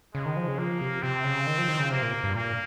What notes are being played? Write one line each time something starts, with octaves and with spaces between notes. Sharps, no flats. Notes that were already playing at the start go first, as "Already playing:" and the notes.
C#3 G#3
D#3
F3
C#3
F3 A#3
C3
C3 C4
C#3
D#3
F3
D#3
C#3
C3 A#3
A#2
G2
A#2 A#3